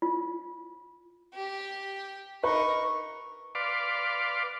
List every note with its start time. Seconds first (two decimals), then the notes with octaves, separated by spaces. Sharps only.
0.02 F4
1.34 G4
2.44 D#4 A#4 B4 C#6
3.55 B4 D5 F5 C6 D6